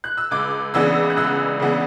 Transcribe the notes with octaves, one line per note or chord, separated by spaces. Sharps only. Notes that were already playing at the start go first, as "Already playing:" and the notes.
F#6
E6
C#2 D6
C#3 E3 B3 D4 E6
F#6
C#2 E6
C#3 E3 B3 D4